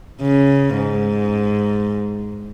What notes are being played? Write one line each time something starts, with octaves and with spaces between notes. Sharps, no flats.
C#3
G#2